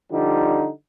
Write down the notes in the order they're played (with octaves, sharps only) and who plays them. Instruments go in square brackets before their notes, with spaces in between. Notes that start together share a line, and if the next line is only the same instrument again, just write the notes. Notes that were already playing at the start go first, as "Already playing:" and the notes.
[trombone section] D3 F3 G3 D#4